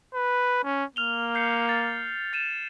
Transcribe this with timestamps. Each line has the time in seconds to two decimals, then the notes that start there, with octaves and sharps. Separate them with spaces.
0.14 B4
0.64 C#4
0.96 A#3 F6 F7 G7
1.35 G6 C7 C#7
1.69 A6
2.33 A6 D#7 E7